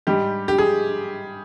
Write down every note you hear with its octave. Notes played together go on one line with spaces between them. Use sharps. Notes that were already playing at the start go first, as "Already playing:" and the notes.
G#2 G3 G4
G4
G#4